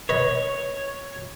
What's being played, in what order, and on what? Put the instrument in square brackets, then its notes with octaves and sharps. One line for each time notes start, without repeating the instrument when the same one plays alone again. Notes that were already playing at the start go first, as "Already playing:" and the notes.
[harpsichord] B4 D#5 [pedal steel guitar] C#5